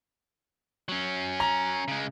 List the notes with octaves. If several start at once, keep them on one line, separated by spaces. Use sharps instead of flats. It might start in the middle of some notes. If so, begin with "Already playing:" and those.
F#3 C#4
A#5
C#3 G#3